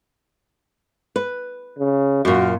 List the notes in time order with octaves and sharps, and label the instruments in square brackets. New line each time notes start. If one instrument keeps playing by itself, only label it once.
[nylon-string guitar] B4
[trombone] C#3
[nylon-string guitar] F#2 A#2 [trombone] F#4